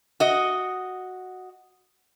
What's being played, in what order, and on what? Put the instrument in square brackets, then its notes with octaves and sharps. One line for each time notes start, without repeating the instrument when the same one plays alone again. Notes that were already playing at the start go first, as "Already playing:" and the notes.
[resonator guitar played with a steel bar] F#4 D#5